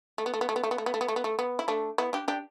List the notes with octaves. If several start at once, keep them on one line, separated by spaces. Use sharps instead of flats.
A3
B3
A3
B3
A3
B3
A3
B3
A3
B3
A3
B3
A3
B3
A3
B3
E4
A3 D4
B3 E4
D4 G4
D4 G4